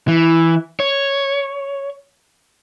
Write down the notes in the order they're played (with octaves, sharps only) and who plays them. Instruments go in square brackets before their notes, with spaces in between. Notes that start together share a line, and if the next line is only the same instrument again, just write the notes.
[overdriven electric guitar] E3
C#5